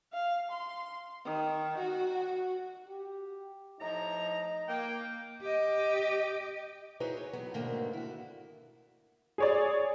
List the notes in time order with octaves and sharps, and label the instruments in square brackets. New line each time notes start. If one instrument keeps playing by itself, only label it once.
[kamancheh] F5
C6
[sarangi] D#3
F#4
[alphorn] G4
[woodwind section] A2 F3 A#5 [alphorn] D#4
[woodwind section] A#3 G5
[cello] G4 D#5
[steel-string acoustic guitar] D#4 E4 F#4 G#4 B4 C#5
C#5
F#3 A3 B3
G#2 B2 D3 D#3 A3 A#3
E4 F#4
[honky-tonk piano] G#4 C#5 D5